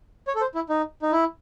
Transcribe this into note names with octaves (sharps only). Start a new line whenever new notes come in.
C#5
A4
C5
E4
D#4
D#4
E4